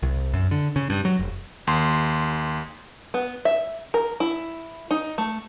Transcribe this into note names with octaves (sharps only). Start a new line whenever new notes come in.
C2
F#2
D3
C#3
G2
F#3
F1
D#2 C6
B3
E5
A#4
E4
D#4
A3